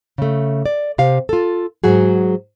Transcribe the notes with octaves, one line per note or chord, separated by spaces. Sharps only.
C#3 A3
D5
C3 G4 F5
F4 A4
G#2 F#3 F#4 G#4